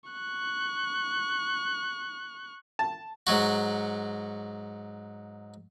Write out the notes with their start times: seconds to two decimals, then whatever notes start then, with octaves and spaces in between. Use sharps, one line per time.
0.10 C#6 F#6
2.79 A5
3.27 G#2 F#3 F#4